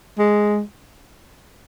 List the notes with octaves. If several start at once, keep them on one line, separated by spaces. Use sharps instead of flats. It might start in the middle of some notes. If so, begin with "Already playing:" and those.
G#3